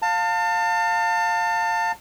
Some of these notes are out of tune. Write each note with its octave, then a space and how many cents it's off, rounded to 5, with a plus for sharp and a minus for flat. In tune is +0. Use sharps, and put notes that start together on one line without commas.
F5 +15 A5 +35